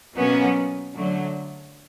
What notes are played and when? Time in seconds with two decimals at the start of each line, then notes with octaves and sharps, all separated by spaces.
0.17 B2 F#3 A#3 B3 C#4
0.94 D3 F#3 A3